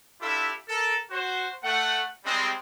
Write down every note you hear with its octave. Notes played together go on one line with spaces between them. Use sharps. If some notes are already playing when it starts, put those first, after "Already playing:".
D4 E4 F4 G4 A4 E5
A4 A#4
F#4 C5
A3 F#5
G3 G#3 C4